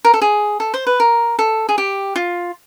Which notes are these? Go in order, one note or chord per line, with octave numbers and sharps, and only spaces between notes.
A#4
A4
G#4
A4
C5
B4
A#4
A4
G#4
G4
F4